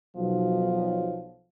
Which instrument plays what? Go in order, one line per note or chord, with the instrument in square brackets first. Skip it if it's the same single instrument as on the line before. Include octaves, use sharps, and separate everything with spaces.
[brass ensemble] B1 [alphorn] F3